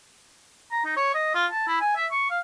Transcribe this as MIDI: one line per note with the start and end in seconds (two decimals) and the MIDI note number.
0.71 0.82 82
0.85 0.93 63
0.96 1.12 73
1.14 1.33 75
1.34 1.46 65
1.51 1.67 81
1.67 1.78 64
1.80 1.96 80
1.96 2.06 76
2.11 2.27 85
2.30 2.39 77